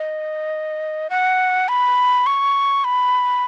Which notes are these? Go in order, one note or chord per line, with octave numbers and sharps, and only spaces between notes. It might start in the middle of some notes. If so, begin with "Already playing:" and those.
Already playing: D#5
F#5
B5
C#6
B5